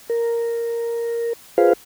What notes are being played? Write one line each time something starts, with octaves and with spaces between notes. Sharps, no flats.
A#4
F4 G#4 B4 C5 F5